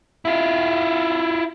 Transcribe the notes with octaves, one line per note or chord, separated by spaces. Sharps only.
E4 F4